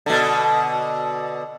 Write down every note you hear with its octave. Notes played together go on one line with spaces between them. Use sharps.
B2 D3